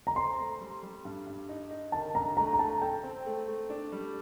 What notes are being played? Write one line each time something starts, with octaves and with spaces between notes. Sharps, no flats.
A#5
C4 C6
A3
G3
G3
G2
G2
D#4
D#4
D#3 A5
G2 A#5
A3 A#5
A#5
A3 A5
A4 G5
C4
A3
A3
D4
G3